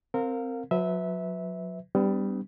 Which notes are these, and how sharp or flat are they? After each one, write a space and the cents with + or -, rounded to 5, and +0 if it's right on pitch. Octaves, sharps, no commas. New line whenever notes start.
C4 +0 A#4 -20 F5 +25
F#3 -30 B4 +15 E5 -15
G3 +0 B3 +35 D4 +0